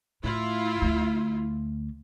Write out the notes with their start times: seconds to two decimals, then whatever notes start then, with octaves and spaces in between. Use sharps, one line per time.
0.24 A2 E4 F4
0.82 D2 A3